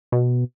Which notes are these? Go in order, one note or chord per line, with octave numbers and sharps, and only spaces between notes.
B2